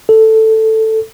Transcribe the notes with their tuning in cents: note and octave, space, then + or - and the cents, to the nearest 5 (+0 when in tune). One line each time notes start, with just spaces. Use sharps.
A4 +5